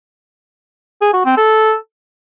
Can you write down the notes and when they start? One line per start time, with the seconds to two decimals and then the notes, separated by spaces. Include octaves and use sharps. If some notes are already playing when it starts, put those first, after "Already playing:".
1.01 G#4
1.13 F#4
1.25 C4
1.37 A4